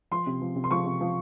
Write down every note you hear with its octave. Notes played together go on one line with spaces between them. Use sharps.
F3 C6
C3
F3
C3
C6
F3 C#6
C3
F3